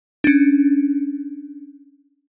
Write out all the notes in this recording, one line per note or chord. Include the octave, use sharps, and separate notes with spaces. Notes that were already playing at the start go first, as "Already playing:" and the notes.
C#4 D4